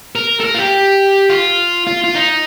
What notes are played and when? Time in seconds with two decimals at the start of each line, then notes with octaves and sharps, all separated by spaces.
0.15 A#4
0.40 A4
0.44 A#4
0.55 F4
0.59 G4
1.30 F4
1.87 F4
2.04 F4
2.16 D#4